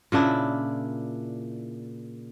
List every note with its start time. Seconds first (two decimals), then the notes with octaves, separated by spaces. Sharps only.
0.12 A#2 C#3 D4 E4